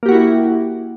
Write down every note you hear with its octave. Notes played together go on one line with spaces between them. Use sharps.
A#3 E4 F#4 G4